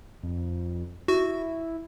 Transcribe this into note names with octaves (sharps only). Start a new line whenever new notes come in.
F2
E4 F#4